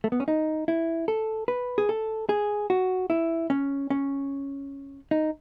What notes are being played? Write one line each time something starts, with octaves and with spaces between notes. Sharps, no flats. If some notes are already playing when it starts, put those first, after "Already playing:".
A3
B3
C#4
D#4
E4
A4
B4
G#4
A4
G#4
F#4
E4
C#4
C#4
D#4